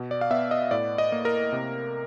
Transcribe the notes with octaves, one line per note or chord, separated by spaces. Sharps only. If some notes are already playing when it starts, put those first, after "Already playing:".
Already playing: B2
D5
F5
B3 E5
D#5
A2 D5
D#5
A#3
A#4
C3